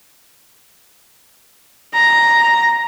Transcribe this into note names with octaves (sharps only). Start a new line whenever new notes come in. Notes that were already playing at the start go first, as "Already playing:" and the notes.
A#5